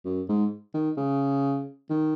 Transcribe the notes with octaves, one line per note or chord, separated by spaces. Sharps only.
F#2
G#2
D#3
C#3
D#3